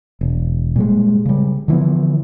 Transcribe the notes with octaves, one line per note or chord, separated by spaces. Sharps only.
E1
A#2 G3 G#3
C#3 G3
D3 E3 F3 B3